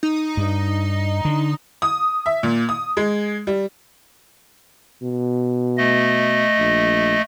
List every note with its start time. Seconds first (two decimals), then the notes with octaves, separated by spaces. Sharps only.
0.03 D#4
0.37 G2
1.25 D3
1.82 D#6
2.26 E5
2.43 A#2
2.69 D#6
2.97 G#3
3.47 G3
5.03 B2
5.77 A3 D#5
6.59 A#1